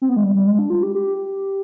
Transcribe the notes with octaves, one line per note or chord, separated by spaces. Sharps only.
C4
B3
G#3
G3
G3
G#3
D4
F4
G4
G4